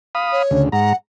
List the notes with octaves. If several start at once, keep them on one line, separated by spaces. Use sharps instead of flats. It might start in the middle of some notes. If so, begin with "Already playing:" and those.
F5 B5 D#6
C#5
D2 C#3
G#2 F#5 A#5